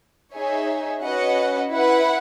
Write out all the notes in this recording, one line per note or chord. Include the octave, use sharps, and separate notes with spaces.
D#4 G#4 C#5 E5 G#5
C#4 F#4 B4 D#5 F#5
E4 B4 F#5